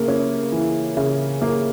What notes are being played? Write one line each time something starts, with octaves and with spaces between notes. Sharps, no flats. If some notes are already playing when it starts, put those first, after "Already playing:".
Already playing: C#3 A#3
C#4
E3
C#3
A#3